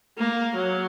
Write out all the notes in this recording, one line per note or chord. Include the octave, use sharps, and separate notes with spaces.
A#3
F#3